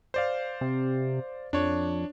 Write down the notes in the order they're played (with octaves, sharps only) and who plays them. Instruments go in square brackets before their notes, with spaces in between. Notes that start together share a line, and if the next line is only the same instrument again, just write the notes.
[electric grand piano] C5 D5 F5
[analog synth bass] C3
[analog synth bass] F2 [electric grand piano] D4 C#5